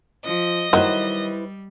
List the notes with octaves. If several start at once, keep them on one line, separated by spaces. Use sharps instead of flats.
F3 D#5
D#3 F#3 G3 E4 B4 C5